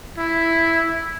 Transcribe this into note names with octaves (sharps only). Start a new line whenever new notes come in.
E4